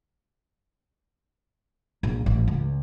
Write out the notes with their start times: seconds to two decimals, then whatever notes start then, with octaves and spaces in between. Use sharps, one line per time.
2.03 A#1
2.26 A1
2.48 C#2